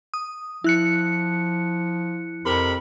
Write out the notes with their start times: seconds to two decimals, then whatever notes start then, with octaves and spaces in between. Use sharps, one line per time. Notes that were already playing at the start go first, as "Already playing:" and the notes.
0.14 D#6
0.64 F3 E4 F#6 C#7
2.45 F2 C3 A#4 B5